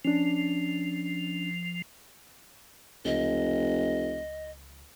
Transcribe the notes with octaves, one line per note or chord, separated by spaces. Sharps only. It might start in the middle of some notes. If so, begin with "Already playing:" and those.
F3 C#4 D4
F1 C#2 D#5